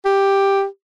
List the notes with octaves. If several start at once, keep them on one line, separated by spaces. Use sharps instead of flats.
G4